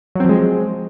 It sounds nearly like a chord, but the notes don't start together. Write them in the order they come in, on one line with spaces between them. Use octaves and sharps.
F#3 C4 F3 G#3